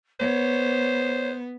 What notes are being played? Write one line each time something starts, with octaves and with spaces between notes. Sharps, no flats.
B3 C5 C#5